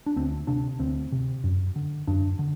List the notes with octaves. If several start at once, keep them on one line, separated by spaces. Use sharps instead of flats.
D4
D2 C4
C3 D4
D2 C4
C3
F#2
D3
F#2 D4
D3